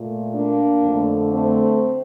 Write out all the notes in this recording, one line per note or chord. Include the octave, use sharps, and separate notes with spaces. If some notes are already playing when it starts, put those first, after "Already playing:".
Already playing: A#2 A3
A#3 D4
F2 D3 A3
A3 C4